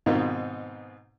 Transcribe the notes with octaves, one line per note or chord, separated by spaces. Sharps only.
G#2 B2 D#3 C4 D#4 F4